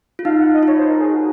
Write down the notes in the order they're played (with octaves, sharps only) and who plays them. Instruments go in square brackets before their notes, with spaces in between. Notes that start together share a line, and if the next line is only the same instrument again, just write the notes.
[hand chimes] F4
[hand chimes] D#4 [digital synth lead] F5
[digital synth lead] F#5
D#5
[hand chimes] F4
[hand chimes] D#4 [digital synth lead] C#5
[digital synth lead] C5
A#4
G#4
F#4